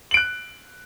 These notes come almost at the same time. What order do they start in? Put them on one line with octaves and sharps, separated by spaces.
F#7 D7 F#6